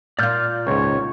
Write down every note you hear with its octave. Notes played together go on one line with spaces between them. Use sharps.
A#2 F4 D5 F6 G6
C#2 G#2 C#5